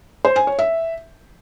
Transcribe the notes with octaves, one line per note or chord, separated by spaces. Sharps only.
C5
G#5
C#5
E5